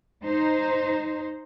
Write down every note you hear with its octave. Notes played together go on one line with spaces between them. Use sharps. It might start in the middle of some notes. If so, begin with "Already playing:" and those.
D#4 C5